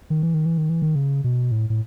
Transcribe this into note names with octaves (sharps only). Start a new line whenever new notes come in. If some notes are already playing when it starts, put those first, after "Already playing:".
D#3
E3
D#3
E3
D#3
E3
D#3
C#3
B2
A2
A2